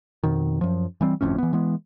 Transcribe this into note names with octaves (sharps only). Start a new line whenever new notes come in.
F2 B2 D#3
F#2 F3
E3 G3 C4
G1 F2 A2 C#4
E3 B3
E3 G#3 B3